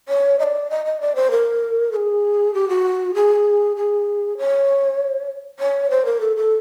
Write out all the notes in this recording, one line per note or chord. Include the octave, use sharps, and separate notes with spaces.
C#5
D#5
D5
D#5
D#5
D5
C5
A#4
A4
G#4
G4
F#4
G#4
G#4
C#5
C#5
C5
A#4
A4
A4